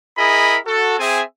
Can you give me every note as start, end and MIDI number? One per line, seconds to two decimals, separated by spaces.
0.17 0.58 64
0.17 0.58 68
0.17 0.58 70
0.17 0.58 75
0.17 0.58 83
0.66 0.98 66
0.66 0.98 69
0.99 1.22 60
0.99 1.22 68
0.99 1.22 76
0.99 1.22 80